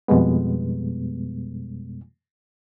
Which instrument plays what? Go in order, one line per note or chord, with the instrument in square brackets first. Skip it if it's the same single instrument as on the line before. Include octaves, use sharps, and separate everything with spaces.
[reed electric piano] F2 B2 G3 G#3 B3